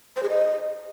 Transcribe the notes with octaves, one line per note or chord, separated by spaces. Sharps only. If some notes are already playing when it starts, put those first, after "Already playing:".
C5
G#4
D#5